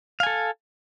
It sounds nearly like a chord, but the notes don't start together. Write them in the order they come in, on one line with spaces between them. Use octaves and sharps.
F5 G#5 A4